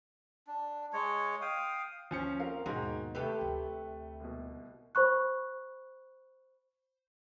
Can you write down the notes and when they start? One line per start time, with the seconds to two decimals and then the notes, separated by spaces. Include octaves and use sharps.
0.47 D4
0.93 G#3 C#5
1.41 F5 G5 D#6
2.11 D#2 F3 C#4 C#7
2.40 C4 A#4 F5
2.66 D#2 G#2 B2 D#3 F#4
3.15 C3 A3 G4 A4 B4
3.41 D2
4.20 C2 B2
4.95 C5 B5 C#6 F#6